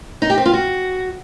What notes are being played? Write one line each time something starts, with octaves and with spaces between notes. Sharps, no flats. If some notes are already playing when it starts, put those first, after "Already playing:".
D#4
G4
C4
F4
F#4